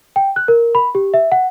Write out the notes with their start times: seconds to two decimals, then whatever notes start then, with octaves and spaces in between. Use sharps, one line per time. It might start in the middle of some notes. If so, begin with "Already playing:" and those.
0.16 G5
0.36 F#6
0.48 A#4
0.75 B5
0.95 G4
1.14 E5
1.32 F#5